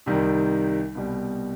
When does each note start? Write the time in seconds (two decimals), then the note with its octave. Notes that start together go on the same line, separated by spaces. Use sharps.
0.06 C2 C3 D#3 G3
0.95 C2 B2 G3